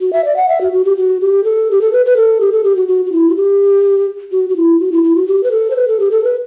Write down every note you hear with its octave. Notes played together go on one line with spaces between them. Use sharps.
F#4
E5
D5
F#5
E5
F#4
F#4
G4
F#4
G4
A4
G4
A4
B4
B4
A4
G4
A4
G4
F#4
F#4
F#4
E4
F#4
G4
F#4
F#4
E4
F#4
E4
E4
F#4
G4
B4
A4
C5
B4
A4
G4
A4
B4